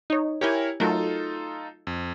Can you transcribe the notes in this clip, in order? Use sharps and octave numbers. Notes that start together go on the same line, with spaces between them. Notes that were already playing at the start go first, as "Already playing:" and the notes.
D#4 C#5
E4 G4 A#4 C#5 G5 G#5
F#3 A3 D#4 F4 A4 A#4
F2